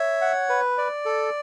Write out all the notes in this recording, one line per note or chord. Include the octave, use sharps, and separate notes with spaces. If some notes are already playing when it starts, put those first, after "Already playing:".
Already playing: C#5 E5
F#5
B4
D5
A4